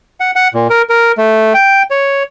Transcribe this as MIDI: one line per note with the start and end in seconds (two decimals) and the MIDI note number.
0.20 0.31 78
0.36 0.48 78
0.54 0.68 46
0.70 0.82 70
0.89 1.12 70
1.18 1.53 57
1.54 1.83 79
1.91 2.23 73